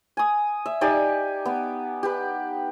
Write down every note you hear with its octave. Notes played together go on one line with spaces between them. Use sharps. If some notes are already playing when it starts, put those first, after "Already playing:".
G#5 D#6
E5
D#4 G4 D5 G#5
B3
G4 B4